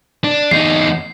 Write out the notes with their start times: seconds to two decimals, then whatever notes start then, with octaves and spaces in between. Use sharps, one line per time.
0.24 D4
0.51 E2 D#4 C7